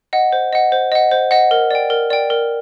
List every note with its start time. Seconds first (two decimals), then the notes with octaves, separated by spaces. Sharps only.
0.13 D#5 F#5
0.33 C5
0.53 D#5 F#5
0.72 C5
0.92 D#5 F#5
1.11 C5
1.31 D#5 F#5
1.51 A#4
1.71 D5 G5
1.90 A#4
2.10 D5 G5
2.30 A#4